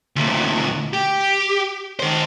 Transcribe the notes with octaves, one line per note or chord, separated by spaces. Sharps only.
D2 A#2
G4
D#3 C5